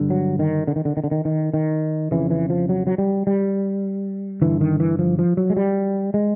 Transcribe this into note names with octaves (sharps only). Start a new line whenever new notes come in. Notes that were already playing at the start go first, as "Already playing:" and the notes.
Already playing: G2 D3
F#3
D#3
D3
D#3
D3
D#3
D3
D#3
D#3
D#3
F2 C#3 E3
E3
F3
F#3
F#3
G3
G3
G2 D3 E3
D#3
E3
F3
F3
F#3
G#3
G3
G#3